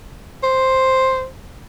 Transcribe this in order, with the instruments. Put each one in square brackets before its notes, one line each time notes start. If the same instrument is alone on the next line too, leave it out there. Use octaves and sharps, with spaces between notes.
[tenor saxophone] C5